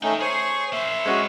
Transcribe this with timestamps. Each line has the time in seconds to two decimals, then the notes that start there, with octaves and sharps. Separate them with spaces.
0.03 A3 C#4 D#4 A#4 G5
0.21 G#4 C5 C#5
0.73 A#3 C5 E5
1.06 G#3 C#4 F#4